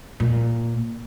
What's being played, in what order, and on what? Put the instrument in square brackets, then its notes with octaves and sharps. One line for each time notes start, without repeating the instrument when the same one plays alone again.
[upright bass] A#2